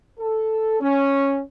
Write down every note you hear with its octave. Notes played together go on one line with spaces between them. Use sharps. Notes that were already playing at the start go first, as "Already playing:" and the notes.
A4
C#4